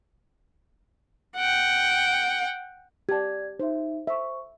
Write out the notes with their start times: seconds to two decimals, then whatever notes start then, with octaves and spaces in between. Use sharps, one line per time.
1.37 F#5 G5
3.09 G4 D5 A5 G#6
3.60 D#4 C5 E5
4.07 C5 E5 C#6